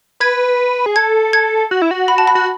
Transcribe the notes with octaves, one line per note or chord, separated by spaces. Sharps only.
B4 G#6
G#4
A4 G#6
G#6
F#4
E4
F#4
B5
A5
B5
F#4